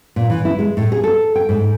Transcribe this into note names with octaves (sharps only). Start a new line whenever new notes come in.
A#2
E3
E4
G#3
A2
G#4
A4
G5
G#2